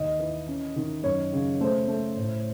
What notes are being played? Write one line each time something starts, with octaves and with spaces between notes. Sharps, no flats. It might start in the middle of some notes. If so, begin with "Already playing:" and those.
Already playing: D#2 D#5
E3
C#4
D#3
F#2 C#5
C#3
A3 C5
A3
A2